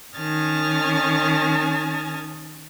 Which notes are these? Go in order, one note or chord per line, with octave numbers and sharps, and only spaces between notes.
D#3 C#4 A5 D#6 F6 G#6